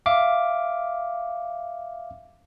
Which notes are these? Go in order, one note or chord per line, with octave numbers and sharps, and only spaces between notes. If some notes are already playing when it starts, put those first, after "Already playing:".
E5 F5 D6